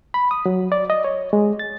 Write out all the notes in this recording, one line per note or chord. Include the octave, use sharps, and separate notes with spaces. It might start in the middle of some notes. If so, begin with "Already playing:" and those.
B5
D#6
F#3
D5
D#5
C#5
G#3
A6